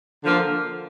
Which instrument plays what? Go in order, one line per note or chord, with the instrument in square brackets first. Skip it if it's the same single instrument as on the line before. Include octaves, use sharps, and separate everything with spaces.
[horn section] D3 F3 A#3